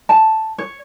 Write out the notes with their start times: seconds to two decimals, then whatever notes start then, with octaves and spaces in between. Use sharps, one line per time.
0.09 A5
0.58 C#5